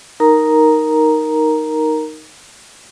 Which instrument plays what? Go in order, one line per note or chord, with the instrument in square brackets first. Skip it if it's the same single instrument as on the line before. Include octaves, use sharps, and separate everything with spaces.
[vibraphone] D#4 A#4 A#5